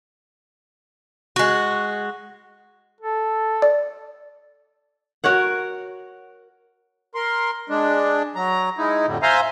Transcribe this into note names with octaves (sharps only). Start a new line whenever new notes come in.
G#3 F#4
A4
D5
F#4 A#4 C#5 F#5
A#4 C6
G#3 D4
F#3 A#5
G#3 D#4 E4
F2 A2 D3 G3
C5 E5 F5 G#5 A#5 C6